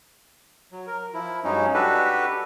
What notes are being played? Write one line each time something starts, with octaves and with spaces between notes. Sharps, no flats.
F#3
A#4
F3 E4
G2 F#3 G#3 C#4 D#4
D4 F#4 G4 A4 B4